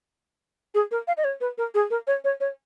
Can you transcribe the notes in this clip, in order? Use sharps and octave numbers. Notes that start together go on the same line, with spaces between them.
G#4
A#4
F5
D#5
C#5
B4
A#4
G#4
A#4
C#5
C#5
C#5